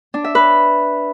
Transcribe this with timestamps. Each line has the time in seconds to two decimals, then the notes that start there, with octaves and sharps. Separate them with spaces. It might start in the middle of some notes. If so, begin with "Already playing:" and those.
0.14 D4
0.24 E5
0.35 B4